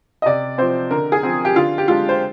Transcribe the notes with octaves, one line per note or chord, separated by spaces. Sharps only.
D#5
C3 D5
F3 C4 C5
D3 A#4
G#4
F3 C4
G4
D3 F4
G4
G#3 D4 F4
C5